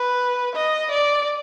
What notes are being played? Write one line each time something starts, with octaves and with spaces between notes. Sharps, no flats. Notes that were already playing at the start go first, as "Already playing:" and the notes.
Already playing: B4
D#5
D5